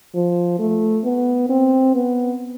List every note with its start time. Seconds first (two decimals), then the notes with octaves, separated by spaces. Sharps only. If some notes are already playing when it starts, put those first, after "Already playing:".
0.15 F3
0.59 A3
1.05 B3
1.49 C4
1.95 B3